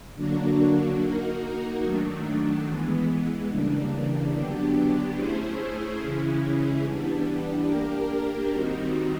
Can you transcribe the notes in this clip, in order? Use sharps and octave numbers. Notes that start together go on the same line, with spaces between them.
D3 F#3 A#3 D4 F#4
A#3 D#4 F#4 A#4
D#3 F#3 A3 D4
E3 G#3 B3
C#3 E3 G3 A#3 D4
D3 F#3 B3 D4 G4
A3 C#4 E4 G#4 C5
C#3 E3 G#3 C#4 E4
E3 G3 B3 D4
A#3 D4 G4 A#4
D#3 G3 C4 D#4 F#4